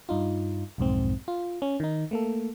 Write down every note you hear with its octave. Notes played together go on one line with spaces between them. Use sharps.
G2 D#4 F4
B1 F2 G#2 C4
F4
C#4
D#3 D#4
A3 A#3 A4